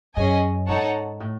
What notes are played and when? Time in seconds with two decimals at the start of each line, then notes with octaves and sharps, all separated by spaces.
0.16 F#2 C#4 G#4 D#5 G#5
0.68 G#2 D#4 A4 C#5 F#5 A5
1.20 A2